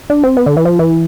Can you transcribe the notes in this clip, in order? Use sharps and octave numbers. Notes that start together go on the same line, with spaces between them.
D4
C4
B3
D3
E3
F3
E3